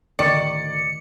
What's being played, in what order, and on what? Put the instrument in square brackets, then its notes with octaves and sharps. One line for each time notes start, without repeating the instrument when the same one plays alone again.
[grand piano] D1 C#6 A6 [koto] D#3 [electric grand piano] D5 [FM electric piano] C#7